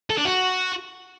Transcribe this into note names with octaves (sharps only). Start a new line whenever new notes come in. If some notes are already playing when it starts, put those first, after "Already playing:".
A4
D4
F#4